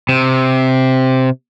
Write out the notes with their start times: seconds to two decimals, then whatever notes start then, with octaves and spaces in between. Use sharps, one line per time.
0.09 C3